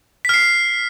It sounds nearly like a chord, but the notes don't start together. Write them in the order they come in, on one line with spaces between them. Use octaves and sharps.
B6 F6 C7